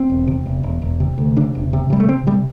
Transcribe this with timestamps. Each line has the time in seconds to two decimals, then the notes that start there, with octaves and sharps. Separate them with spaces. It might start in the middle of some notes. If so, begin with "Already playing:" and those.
Already playing: C4
0.10 E1
0.27 C3
0.46 E1
0.63 E1
0.82 E1
1.00 C3
1.18 D2
1.36 C3 D4
1.55 E1
1.73 C3
1.90 C3 G3
2.00 A3
2.08 C3 C4
2.27 C3 G3